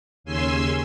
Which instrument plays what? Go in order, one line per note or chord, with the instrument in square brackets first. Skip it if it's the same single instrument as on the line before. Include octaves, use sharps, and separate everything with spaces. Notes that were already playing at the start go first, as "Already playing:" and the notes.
[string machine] D#2 C#3 C#4 G#5 C6 E6